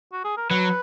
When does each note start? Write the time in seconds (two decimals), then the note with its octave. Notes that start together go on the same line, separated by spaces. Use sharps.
0.12 F#4
0.24 G#4
0.37 A#4
0.49 F#3 B4